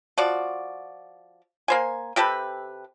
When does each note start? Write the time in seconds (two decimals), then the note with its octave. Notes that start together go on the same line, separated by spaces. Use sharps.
0.18 F3 F#4 D5
1.68 A#3 C5 G#5
2.16 C3 G4 A4 B4